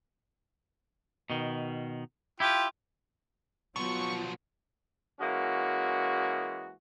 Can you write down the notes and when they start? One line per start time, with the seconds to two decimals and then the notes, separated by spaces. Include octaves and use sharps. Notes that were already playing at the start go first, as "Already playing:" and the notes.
1.30 B2 D#3
2.40 E4 F4 G4 G5
3.76 B2 F3 F#3 B3 F4 C#6
5.20 E3 G#3 A#3 C#4 F#4